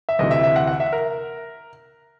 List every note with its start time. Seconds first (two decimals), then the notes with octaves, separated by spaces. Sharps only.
0.09 E5
0.19 D2 C3 E3 D#5
0.31 E5
0.43 E5
0.56 F#5
0.67 F#5
0.80 E5
0.93 A#4